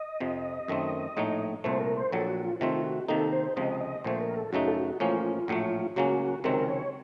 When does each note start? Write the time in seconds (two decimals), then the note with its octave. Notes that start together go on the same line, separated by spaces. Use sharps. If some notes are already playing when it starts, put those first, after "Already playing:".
Already playing: D#5
0.20 F2 C3 F3
0.68 F#2 D#3 A3 C4
1.17 A#1 A2 A3 D#4
1.64 C2 A#2 A3 C5
1.80 A#4
1.97 C5
2.12 A#1 A#2 F#3 A4
2.28 F#4
2.45 F4
2.60 C3 D#3 A3 C4 F4
2.84 F#4
3.08 C3 D#3 A#3 D#4 A4
3.32 C5
3.56 C#2 C3 F3 D#5
3.80 D#5
4.04 A#1 A#2 A3 C5
4.21 A#4
4.36 A4
4.52 F#2 C#3 A3 D#4 F#4
4.67 A4
4.76 F#4
5.00 A1 A2 F3 A#3 C#4 F4
5.48 A#1 A2 F#3 A3
5.96 C#2 C#3 F#3 A#3 C#4 F#4
6.44 C#2 C3 D#3 F#3 C4 A#4
6.68 C#5